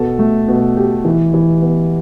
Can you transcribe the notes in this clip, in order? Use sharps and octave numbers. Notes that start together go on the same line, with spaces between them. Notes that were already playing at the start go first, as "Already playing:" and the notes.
Already playing: B2 A4
A3
B2
G4
E3
E3
B3